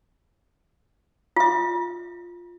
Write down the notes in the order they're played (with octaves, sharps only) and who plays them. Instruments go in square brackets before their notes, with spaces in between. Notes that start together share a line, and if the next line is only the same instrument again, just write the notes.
[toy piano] F4 E5